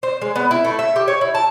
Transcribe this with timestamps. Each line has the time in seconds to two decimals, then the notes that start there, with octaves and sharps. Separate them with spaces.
0.03 C5
0.22 G#3
0.36 B3
0.51 E4
0.64 A3
0.79 E5
0.96 G4
1.08 C#5
1.21 E4
1.35 A5